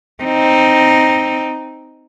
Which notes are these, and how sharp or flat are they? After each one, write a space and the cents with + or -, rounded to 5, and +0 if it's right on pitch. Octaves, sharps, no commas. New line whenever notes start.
C4 +0 D#4 +0